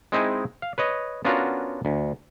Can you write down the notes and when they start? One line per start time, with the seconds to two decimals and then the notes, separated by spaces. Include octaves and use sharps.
0.12 G#3 C4 D#4 E4 G#5
0.62 F5
0.78 B4 C#5 D#5
1.25 B3 C#4 D4 F4 F#4 A#4
1.85 D2